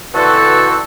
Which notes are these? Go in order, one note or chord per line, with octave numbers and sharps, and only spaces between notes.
B2 D3 E3 C4 F#4 A4